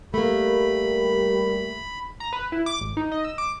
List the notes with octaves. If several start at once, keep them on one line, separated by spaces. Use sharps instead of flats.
G3 A3 A#3 G4 A#4 B5
A#5
B4
E4
D6
G#1
D#4
D#5
E6
D6